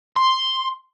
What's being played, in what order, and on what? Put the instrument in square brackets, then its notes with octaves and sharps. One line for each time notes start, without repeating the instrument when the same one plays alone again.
[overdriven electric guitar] C6